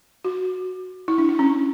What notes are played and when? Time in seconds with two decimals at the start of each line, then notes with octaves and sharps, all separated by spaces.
0.24 F#4
1.08 E4
1.18 D4
1.29 E4
1.39 C#4